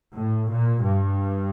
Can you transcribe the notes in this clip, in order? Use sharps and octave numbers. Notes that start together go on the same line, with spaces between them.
A2
A#2
G2